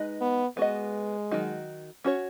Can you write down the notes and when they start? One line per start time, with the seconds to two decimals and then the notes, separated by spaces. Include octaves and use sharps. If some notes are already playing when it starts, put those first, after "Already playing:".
Already playing: G#3 D#4 B4 D#5
0.21 B3
0.57 G#3 B3 F#4 D#5
1.31 D#3 F#3 D#4 F#4
2.04 C#4 F#4 C#5